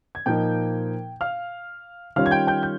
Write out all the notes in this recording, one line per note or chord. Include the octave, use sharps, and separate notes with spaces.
G#6
A#2 F3 A#3 D#4 G5 G6
F5 F6
D#3 G3 C#4 F4 F5 F6
G#6
G5 G6
G5 G6
G6